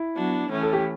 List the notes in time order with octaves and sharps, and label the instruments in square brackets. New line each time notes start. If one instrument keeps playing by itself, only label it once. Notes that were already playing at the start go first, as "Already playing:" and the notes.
Already playing: [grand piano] E4
[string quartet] F#3 B3 D4 F#4
A2 E3 A3 C#4
[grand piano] A4
G4